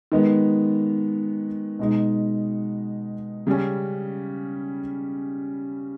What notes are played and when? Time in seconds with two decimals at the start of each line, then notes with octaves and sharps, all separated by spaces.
0.12 D#3 G#3 B3
1.79 B2 G#3 D#4
3.47 C#3 G3 C#4